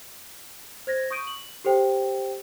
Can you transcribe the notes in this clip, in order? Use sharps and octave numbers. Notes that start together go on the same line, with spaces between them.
C5 G#6 A#6
C#6 D#6 G6 D7 D#7
F#7
G4 A4 C5 G5